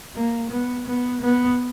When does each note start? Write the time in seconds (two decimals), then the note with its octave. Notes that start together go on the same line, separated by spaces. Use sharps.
0.15 A#3
0.51 B3
0.87 B3
1.22 B3